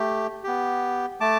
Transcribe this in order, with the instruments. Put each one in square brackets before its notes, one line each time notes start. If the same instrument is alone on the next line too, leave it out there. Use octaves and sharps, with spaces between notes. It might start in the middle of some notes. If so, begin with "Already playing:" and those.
Already playing: [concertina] A3 G4
B3 G4
A3 A5 D6